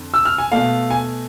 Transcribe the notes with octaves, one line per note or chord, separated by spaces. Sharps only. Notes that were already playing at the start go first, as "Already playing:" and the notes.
Already playing: F2 D3
E6
F6
G#5
B2 A3 F5
G#5